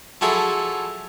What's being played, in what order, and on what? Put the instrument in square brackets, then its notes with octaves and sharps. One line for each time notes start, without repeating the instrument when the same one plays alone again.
[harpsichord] F3 F#3 E4 G#4 A4